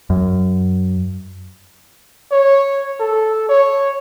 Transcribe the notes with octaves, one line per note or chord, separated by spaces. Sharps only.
F#2
C#5
A4
C#5